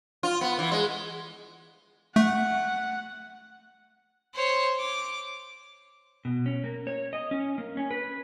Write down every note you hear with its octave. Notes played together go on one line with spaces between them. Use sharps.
F4
B3
E3
G#3
A3 F#5
C5 C#5
D6
B2
C#4
A#3
C#5
D#5
C#4
A#3
C#4
B4